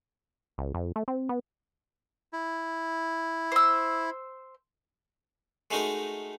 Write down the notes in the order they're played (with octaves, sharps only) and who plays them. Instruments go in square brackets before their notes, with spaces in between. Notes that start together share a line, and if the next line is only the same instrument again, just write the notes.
[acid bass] C#2
F2
A3
C4
B3
[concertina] E4
[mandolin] C5 E6
[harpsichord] G#3 A3 D#4 F#4 A#4